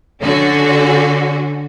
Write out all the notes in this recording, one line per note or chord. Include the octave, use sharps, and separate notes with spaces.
D3 C#4 F#4